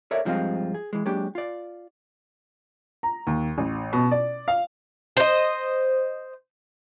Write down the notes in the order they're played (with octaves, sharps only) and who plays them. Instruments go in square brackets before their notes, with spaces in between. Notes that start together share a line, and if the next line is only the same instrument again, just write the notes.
[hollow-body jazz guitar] A4 A#4 C#5 D5 E5
G2 F3 G#3 C4 E4 F4
G#4
E3 G#3
F#3 G#3 A#3 D4 G4
F4 D5
[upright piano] A#5
D#2
A1
B2
D5
F5
[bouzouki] C5 D#5